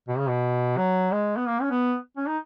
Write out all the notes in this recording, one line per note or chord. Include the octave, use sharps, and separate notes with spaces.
B2
C#3
B2
F#3
G#3
B3
A#3
C#4
B3
C#4
D#4